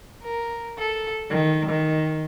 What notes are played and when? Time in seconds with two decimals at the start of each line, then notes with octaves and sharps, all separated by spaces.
0.22 A#4
0.78 A4
1.30 D#3
1.69 D#3